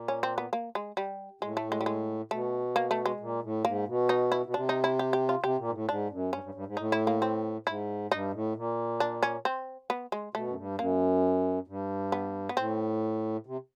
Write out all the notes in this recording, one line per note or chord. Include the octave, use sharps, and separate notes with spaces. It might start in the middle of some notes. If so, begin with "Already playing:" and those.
Already playing: A#2
C#4
C4
B3
A#3
G#3
G3
A2 G#3
A3
G#3
G3
G#3
B2 A3
A#3
A3
G#3
A#2
A2
G#2 A#3
B2
D#4
E4
B2
C3 D4
D#4
E4
G4
G4
F4
C3 G4
A#2
G#2
A2
G#2 D4
F#2
G2 C#4
G2
G2
G#2
A2 D#4
E4
A#3
C4
G#2 E4
G2 D#4
A2
A#2
D4
C#4
C4
B3
G#3
B2 A3
F#2
G2
F#2 A#3
G2
B3
B3
A2 C4
C3